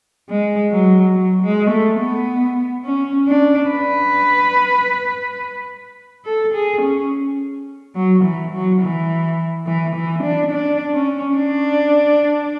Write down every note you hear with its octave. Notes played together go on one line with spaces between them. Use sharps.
G#3
F#3
F#3
G#3
A3
B3
C#4
D4
B4
A4
G#4
C#4
F#3
E3
F#3
E3
E3
E3
D4
D4
C#4
D4